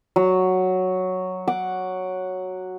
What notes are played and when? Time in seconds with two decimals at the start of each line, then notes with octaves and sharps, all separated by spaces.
0.16 F#3
1.48 F#5 D6